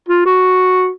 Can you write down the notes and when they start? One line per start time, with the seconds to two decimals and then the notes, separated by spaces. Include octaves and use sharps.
0.09 F4
0.26 F#4